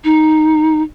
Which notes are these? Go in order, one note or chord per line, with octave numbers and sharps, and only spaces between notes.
D#4